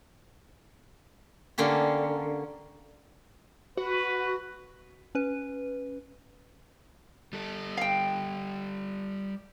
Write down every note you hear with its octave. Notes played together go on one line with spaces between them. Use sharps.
D3 A#3 C#4 G4
F#4 B4
C#4 B4
G3 A4
F5 G5